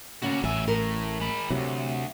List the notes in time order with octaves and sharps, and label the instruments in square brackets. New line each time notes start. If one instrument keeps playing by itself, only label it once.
[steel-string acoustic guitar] C#3 A#3 C#4 [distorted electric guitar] F#4 D5
[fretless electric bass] A1 [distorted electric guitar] F#3 E5 [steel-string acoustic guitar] G#5
[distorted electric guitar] A2 [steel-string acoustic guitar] A#4
[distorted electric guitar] G#3 B5
[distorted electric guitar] D2 E3 [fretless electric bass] C3 F#3